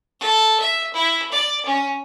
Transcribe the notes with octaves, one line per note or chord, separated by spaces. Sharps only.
A4
E5
E4
D5
C#4